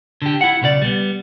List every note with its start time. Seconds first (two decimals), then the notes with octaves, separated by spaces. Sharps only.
0.22 D3 G4
0.41 E4 F#5
0.62 B1 C#3 B4 D5
0.82 G3 B3